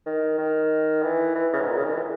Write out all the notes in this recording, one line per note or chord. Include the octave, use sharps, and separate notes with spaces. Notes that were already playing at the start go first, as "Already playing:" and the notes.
D#3
D#3
E3
E3
C#3
G#2
A#2
C#3
D#3
E3